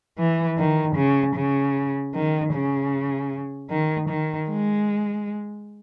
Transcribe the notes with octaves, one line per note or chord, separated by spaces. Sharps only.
E3
D#3
C#3
C#3
D#3
C#3
D#3
D#3
G#3